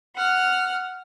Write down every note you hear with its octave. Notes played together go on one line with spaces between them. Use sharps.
F#5 F6